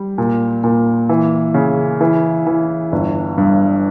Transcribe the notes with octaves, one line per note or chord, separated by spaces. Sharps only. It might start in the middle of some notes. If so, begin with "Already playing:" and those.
Already playing: G3
A#2
A#2
E3
C#3
E3
E3
G1
G2